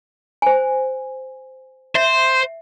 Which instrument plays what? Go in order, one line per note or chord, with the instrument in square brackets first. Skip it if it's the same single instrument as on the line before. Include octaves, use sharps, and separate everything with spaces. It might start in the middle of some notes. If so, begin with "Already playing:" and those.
[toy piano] C5 G#5
[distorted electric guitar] C5 [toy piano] E5